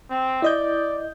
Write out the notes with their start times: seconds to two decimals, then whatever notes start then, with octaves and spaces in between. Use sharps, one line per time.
0.11 C4
0.42 E4 D5 D#5 G6